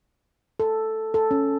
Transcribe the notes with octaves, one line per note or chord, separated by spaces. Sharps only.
A4
A4
C#4